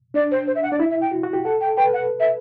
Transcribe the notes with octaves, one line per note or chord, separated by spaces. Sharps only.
D4 D5
C5
C5
E5
F#5
D4 D5
E4 E5
E5
G5
F#4
F#4
G4
A4 F#5
G5
B4 G5
F#5
E5